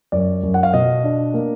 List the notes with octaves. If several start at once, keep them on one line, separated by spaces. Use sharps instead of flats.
F#2 D5
F#2
F#5
F5
B2 D#5
D4
A#3